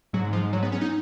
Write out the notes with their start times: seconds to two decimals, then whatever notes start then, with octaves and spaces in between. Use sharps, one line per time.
0.13 G#2 F#3
0.33 F3
0.53 F#3
0.63 B3
0.72 C#4
0.81 D#4